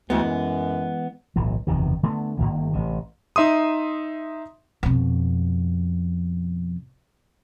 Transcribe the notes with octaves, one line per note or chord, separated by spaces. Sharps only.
D2 E3 G#3 B3
F#2
D1 B1 E3
F#1 E2 C3 D#3
D3 A3 B3
G1 E2 D#3 A#3
A1 C3
D#4 E5 C6 D#6
F2 B2